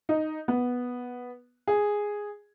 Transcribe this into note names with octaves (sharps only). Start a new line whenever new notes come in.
D#4
B3
G#4